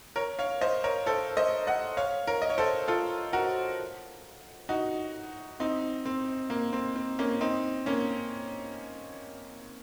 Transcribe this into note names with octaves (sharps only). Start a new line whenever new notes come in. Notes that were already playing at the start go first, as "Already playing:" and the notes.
A#4 C#5
C#5 F5
C5 D#5
A#4 C#5
A4 C5
C5 D#5
D#5 F#5
C#5 F5
A#4 C#5
D#5
C#5
A4 C5
F4 A4
F#4 A#4
D#4 F#4
C4 D#4
C4
A#3
C4
C4
A#3 C#4
C4 D#4
A#3 C#4